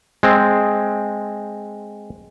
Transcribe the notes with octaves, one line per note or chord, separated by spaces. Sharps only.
G#3 C4